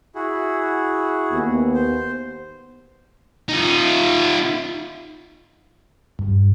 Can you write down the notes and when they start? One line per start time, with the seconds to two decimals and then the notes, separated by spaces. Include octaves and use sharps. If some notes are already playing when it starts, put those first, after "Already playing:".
0.15 E4 F#4 G#4
1.30 D#2 B3
1.74 C5
3.49 D#4 F4
6.19 G2